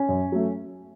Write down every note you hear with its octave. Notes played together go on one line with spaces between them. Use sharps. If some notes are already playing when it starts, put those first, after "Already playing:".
Already playing: C#4
F#2
F#3 A3